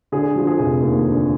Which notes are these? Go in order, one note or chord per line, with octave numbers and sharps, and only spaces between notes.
D3 G#4
F3
G#4
F1
D#2
D3